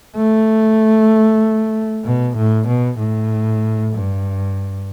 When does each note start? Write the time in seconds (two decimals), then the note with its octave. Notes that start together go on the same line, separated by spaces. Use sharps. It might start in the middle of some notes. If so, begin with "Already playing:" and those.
0.16 A3
2.04 B2
2.37 A2
2.67 B2
2.99 A2
3.93 G2